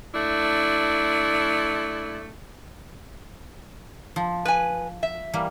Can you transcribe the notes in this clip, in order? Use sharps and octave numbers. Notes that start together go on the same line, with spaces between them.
A3 D4 E4
F3
B4 G#5
E5
E3 G3 A#3